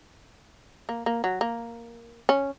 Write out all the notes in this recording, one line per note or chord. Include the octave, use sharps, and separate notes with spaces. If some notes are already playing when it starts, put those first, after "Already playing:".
A#3
A#3
F#3
A#3
C#4